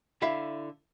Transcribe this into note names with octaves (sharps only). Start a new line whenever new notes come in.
D3 E4 E5 F5